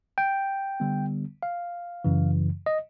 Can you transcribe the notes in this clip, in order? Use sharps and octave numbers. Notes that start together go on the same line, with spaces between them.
G5
D3 G3 B3
F5
F#2 C#3 E3
D#5